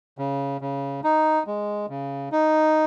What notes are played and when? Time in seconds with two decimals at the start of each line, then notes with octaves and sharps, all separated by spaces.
0.18 C#3
0.61 C#3
1.04 D#4
1.47 G#3
1.89 C#3
2.32 D#4